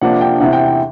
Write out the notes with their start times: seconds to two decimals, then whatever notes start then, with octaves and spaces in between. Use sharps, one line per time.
0.02 C3 F3 A#3 D4 F#5
0.21 G5
0.40 E2 C3 E3 F#5
0.53 G5
0.66 G5